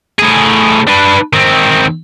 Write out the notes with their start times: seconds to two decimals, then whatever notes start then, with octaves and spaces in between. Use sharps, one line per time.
0.19 A2 G#4
0.87 D4 B4
1.33 D#3 C4